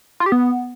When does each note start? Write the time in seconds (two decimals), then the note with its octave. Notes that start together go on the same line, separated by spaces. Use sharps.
0.20 F4
0.26 G4
0.32 B3